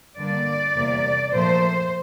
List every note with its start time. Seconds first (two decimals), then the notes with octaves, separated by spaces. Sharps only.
0.17 G2 D3 G3 A#3 D5
0.74 E2 C3 G3 A#3
1.32 A#2 F3 A3 C5